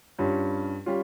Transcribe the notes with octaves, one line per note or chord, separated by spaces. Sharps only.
G2 G3 C#4 F4
G3 C#4 F4